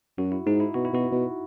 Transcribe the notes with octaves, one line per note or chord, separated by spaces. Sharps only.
F#2 F#4
E4
G#2 D#4
E4
B2 F#4
E4
B2 F#4
B2